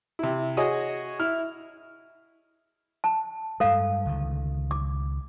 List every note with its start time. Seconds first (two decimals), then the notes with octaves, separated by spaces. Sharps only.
0.19 C3 E4
0.57 F#4 G#4 C#5 D#5
1.20 E4 F6
3.04 A5
3.60 G2 G#3 A4 F5
4.06 C#2 D3 D#3
4.71 D6